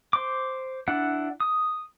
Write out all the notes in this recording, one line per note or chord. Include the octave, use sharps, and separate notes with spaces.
C5 D6
D4 E4 F#5
D#6